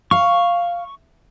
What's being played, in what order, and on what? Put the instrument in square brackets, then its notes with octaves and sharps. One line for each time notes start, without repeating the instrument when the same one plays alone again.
[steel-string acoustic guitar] F5 [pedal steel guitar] C#6